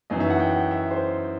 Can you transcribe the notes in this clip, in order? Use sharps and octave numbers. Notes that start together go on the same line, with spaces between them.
F#2 E3 B3 D#4 D#5
E5
F#5
G5
F#5
E5
C5